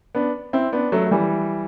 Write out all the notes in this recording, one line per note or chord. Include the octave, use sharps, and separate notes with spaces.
B3 D4
C4 E4
B3 D4
F#3 A3
A3
E3 G3